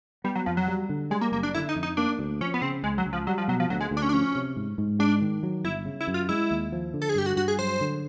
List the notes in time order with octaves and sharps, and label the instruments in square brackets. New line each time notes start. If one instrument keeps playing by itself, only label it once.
[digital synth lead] G3 [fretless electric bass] B3
[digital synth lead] F#3
[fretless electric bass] F2 [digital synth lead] F3
[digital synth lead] F#3
[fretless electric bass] G3
D3
[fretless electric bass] G3 [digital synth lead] G#3
[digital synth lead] A#3
[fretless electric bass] F#1 [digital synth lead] A#3
[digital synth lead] D4
[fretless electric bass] D3 [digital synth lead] E4
[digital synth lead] D#4
[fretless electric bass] F2
[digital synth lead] D#4
[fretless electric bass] A#3 [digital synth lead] D4
[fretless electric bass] D2
[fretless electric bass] F3 [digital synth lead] C#4
[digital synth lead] B3
[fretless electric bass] C#3 [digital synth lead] C4
[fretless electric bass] C#2 [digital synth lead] G#3
[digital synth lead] F#3
[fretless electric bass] C#2
[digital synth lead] F3
[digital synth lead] F#3 [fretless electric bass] G3
[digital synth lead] F3
[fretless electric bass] B2 [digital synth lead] F#3
[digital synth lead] F3
[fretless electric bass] D2 [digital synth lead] F#3
[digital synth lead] G#3
[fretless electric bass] D2
[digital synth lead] D4
C#4
D4
[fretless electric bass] F3 [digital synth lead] C#4
[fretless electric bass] C3
G#2
G#2
[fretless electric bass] G#3 [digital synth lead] D4
[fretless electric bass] D#3
F#3
[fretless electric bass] G1 [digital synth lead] E4
[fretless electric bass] C#3
[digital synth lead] E4
[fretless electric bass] F#2
[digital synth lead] F4
[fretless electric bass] G#3 [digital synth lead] E4
[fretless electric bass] D#2
F3
D3
[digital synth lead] A4
G#4
[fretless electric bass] G2 [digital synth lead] G4
[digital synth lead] F#4
[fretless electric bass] G2 [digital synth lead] F#4
[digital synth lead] G#4
[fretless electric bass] F#3 [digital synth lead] C5
[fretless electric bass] D3